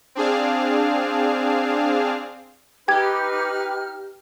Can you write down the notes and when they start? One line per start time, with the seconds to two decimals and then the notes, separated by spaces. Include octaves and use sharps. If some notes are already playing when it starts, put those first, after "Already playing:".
0.15 C4 D4 G#4 F5
2.88 D#4 G4 B4 G5 F6 G#6